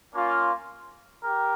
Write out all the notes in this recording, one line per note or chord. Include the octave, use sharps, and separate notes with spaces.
A#3 C#4 F4
G4 A#4